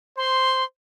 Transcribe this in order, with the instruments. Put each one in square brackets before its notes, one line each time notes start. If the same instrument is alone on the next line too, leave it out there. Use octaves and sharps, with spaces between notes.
[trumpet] C5 [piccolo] C6